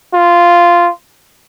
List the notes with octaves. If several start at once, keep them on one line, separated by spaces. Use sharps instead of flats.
F4